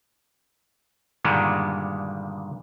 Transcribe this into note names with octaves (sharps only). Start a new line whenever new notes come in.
G2 A#2 D3 D#3 G3 G#3